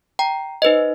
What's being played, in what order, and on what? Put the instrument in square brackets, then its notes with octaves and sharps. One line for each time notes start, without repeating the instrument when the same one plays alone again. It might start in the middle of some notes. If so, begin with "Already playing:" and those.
[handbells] G5 A#5
D#4 B4 C5 D#5